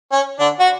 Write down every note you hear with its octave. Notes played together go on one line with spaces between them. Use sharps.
C#4
D3 D4
F#4